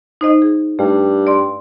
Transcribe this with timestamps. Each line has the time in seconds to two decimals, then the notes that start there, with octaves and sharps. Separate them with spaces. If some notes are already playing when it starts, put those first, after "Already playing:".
0.21 D#4 C5 D#5
0.42 G#4
0.79 G2 A3
1.27 D5 C6